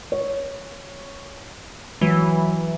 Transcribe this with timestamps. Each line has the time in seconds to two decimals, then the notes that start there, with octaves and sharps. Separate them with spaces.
0.12 C#5
2.01 E3 F#3